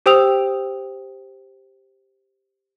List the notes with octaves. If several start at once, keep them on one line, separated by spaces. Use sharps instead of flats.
G4 C5 G5 D#6 E6 F7